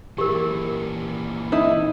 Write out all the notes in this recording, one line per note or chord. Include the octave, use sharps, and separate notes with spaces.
A#2 E3 G4 A#4
D#4 E4